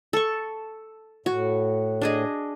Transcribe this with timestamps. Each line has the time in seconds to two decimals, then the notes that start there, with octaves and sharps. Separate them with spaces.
0.13 A4 C#6
1.26 A2 F#4
2.01 D4 G#4 D#5